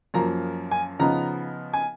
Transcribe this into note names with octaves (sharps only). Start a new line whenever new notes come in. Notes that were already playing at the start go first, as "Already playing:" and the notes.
F#2 F3 A#3 A#5
G#5
C#3 F3 B3 D#4 A#5
G#5